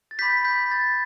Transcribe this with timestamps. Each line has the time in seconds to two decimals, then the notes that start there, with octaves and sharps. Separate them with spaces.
0.11 A6
0.19 B5 D6 G6 B6
0.45 G6 B6
0.71 A6